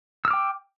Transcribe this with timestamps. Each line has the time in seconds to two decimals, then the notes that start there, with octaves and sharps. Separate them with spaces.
0.25 E6
0.28 F6
0.31 D6
0.33 G5